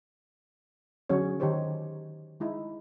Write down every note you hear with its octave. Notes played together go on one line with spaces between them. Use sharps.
D3 F#3 C#4 G#4 C#5
D#3 D#4 G4 C5 C#5
G#3 D#4 E4